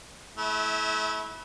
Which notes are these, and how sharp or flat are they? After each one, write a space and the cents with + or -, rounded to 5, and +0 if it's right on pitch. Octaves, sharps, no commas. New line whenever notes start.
A3 -40 E4 -20